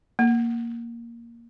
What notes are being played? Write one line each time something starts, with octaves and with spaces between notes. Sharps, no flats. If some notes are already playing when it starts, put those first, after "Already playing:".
A#3